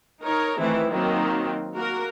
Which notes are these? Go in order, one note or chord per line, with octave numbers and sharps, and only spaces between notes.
D#4 A#4 C#5
D#3 E3 A3 C4 E4
D#3 F#3 A#3 C4 D#4
A#3 F#4 A#4